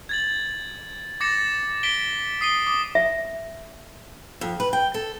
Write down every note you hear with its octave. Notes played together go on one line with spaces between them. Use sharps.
G#6 A6 F#7
D6 A6 A#6 C#7 E7
B6 D7 G7
D#6 C7 D#7 G7
D6 D#6
E5
F2
B4
G5
A4